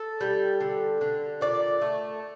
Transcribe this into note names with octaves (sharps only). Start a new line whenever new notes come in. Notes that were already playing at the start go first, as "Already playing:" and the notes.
Already playing: A4
G3
D3
D3
A#2 D5
A3